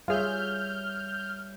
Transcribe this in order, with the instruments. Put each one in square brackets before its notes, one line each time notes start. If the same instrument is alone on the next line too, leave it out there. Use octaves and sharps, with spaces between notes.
[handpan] G3 C#5 E5 [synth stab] F4 G#4 [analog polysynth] F6 G6